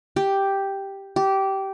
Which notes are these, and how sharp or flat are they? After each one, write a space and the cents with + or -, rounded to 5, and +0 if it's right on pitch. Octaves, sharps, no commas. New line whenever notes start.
G4 +0
G4 -15